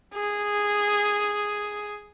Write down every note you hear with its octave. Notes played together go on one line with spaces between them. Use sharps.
G#4